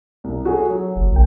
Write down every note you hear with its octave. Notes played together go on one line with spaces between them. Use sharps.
C2
F#4 G#4 A4
F#3
F#1
A#1 A#3 G5